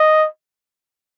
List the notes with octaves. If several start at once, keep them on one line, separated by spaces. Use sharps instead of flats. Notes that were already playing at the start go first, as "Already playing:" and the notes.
Already playing: D#5